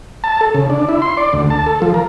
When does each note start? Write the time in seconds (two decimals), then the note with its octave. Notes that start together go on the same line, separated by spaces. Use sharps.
0.24 A5
0.41 A4
0.55 C#3
0.70 D4
0.89 E4
1.02 C6
1.17 D5
1.33 D2
1.50 A5
1.66 A4
1.82 F3
1.94 A#4